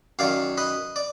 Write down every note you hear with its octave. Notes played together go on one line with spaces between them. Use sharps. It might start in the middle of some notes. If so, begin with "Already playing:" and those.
F#2 D#3 F#3 D5 F5
B4 D#5
D5